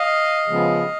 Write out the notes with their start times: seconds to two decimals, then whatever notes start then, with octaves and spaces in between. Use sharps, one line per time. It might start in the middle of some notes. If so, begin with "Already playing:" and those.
Already playing: D#5 F5
0.47 C#3 F3 G#3 B3